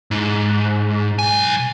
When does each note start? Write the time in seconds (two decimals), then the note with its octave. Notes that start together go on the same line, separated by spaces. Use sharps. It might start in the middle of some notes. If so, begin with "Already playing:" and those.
0.11 G#2
1.19 B1 G#5